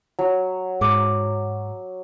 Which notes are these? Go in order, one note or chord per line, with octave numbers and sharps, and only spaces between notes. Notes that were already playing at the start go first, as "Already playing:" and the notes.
F#3
G#2 G#4 D6